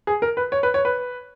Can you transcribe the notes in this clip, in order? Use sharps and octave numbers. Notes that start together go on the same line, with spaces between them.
G#4
A#4
B4
C#5
B4
C#5
B4